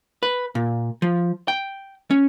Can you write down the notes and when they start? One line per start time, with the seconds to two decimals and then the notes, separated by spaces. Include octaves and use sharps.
0.23 B4
0.55 A#2
1.02 F3
1.48 G5
2.11 C#4